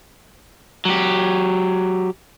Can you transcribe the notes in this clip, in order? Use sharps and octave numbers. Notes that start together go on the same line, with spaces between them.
F#3 G4